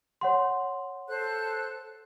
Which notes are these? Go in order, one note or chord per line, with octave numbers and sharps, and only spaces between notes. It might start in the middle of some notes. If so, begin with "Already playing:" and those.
C#5 F#5 C6
A4 C5 F#6